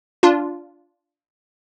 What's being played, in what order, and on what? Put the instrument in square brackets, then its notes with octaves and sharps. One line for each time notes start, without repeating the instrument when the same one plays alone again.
[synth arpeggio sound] D4 F4